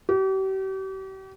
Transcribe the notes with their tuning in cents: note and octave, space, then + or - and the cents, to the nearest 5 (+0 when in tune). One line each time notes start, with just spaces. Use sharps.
G4 -40